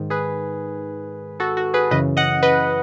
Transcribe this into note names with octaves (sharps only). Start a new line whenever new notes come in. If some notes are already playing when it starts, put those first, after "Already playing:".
Already playing: G#2 D#3
G#4 B4
F#4 A4
F#4
G#4 B4
F#2 C#3 E3 B4 D#5
D#5 F#5
B4 D#5